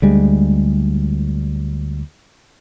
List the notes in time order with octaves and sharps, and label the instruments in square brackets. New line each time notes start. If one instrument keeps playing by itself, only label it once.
[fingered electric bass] D2 G3 G#3